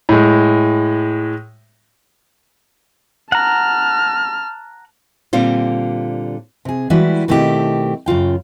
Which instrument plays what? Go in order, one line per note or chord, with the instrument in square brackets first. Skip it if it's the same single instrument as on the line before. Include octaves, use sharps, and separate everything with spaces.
[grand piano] A2 G#3
[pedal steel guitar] F#5 A#5 [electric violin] A5 F6
[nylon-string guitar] A#2 D3 G3 C4 F4
[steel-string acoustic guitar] C3 G#4
E3 G3 G#3 E4 F#4 B4
B2 D#3 A3 C4 E4 G4
F#2 C#3 F4 G5